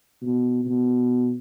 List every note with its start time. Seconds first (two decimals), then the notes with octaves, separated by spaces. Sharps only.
0.22 B2
0.65 B2